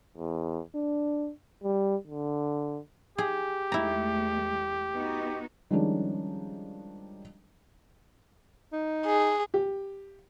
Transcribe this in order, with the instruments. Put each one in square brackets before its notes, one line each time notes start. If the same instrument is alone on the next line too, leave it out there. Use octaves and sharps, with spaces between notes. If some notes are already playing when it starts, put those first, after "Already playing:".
[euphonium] E2
D4
G3
D3
[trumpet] G4 [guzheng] G#4
[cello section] E2 G#3 A3 [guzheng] E4 A#5
[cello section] B3 D#4 F#4
[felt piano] D#3 F3 G3 G#3 C#4 D4
[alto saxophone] D#4
[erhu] G#4
[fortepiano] G4